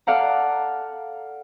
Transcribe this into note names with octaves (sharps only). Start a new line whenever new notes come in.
A4 D5 F5 F#5 A#5